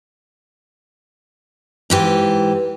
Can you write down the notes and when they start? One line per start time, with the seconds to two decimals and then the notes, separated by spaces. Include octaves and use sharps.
1.90 G#2 E3 G4